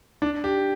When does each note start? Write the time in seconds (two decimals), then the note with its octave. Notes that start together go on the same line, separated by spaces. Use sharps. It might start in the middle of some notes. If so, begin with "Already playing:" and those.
0.22 D4
0.44 G4